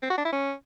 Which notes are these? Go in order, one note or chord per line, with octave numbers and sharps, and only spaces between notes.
C4
F#4
D4
E4
C#4